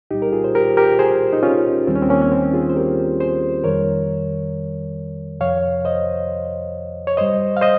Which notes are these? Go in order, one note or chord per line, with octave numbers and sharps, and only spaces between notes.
C2 A#2 G3 D#4 G4
A#4
F4 G#4
C5
G4 A#4
G4 A#4
G#4 C5
D#4
C#4 F4
D#2 D#3 G3 C4
C#4
C4
A#3 C#4
C#4
C4 D#4
F4 G#4
C5
G4 A#4
G#4 C5
F2 D#3 G3 A#4 C#5
F2 C3 F3 C#5 F5
C5 D#5
C#5
G2 G3 C5 D#5
F5
C5 D#5